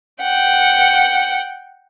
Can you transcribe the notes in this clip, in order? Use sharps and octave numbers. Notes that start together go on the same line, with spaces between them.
F#5 G5